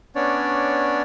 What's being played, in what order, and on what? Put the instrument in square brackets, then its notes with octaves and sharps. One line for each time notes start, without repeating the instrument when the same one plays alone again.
[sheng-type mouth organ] B3 C#4 D4 C#5 D5